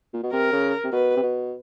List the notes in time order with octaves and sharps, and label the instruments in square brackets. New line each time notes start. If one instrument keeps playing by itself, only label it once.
[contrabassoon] A#2
B2
[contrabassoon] C3 [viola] A#4
[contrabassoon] C#3
C3
[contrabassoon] B2 [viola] B4
[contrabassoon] C3
B2